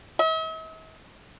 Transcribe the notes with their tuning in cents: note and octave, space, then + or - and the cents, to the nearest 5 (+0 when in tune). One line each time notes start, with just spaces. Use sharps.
E5 -45